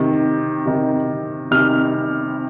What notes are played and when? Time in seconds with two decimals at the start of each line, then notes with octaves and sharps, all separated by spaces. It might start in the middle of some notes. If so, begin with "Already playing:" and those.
Already playing: C3 D#3
0.65 C3 D#3
1.51 C3 D#3 F6